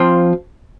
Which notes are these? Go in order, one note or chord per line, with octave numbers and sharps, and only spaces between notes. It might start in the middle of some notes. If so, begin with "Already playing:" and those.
Already playing: F3 C4 F4